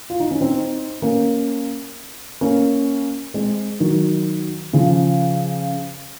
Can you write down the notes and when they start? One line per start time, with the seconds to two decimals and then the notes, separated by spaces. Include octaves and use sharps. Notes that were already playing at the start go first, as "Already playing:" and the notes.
0.10 F4
0.20 D#4
0.31 C#4
0.41 C4 D#4
1.02 A#3 C#4
2.41 A#3 C#4
3.34 G#3 C4
3.80 D#3 F#3
4.73 C#3 F3